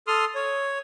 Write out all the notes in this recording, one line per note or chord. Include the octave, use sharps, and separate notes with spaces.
A4 C6 D#6 F6
C#5